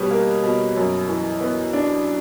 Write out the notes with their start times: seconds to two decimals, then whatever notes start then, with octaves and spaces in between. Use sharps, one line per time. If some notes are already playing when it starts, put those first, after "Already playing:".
Already playing: B2 G3 B4 C#5
0.11 A#3
0.43 B2
0.76 F#2 C#5
1.08 E3
1.41 B3
1.73 D4